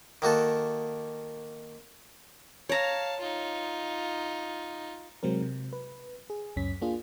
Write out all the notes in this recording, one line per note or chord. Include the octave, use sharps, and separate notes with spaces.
D#3 A#3 F#4 A4
C#5 F5 A5 A#5
D#4 F4
C3 F#3 G#3 C4 A#4
C3
B4
G#4
C#2 F#2 C#4 B6
A#3 D4 F4 G#4